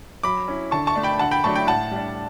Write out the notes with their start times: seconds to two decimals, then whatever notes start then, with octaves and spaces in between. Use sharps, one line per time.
0.23 F#3 B5 D6
0.48 C#4 E4
0.71 D3 A5 C#6
0.87 A5 C#6
0.95 A3 D4
1.03 G5 B5
1.19 D3 F#5 A5
1.31 G5 B5
1.44 F#3 A3 D4 A5 C#6
1.56 G5 B5
1.67 A2 F#5 A5
1.91 G3 D4